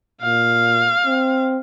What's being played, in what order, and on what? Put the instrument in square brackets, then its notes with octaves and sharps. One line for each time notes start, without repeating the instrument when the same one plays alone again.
[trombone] A#2 [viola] F5
[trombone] C4